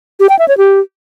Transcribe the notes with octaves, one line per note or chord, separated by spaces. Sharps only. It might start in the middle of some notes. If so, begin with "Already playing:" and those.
G4
G5
E5
C#5
G4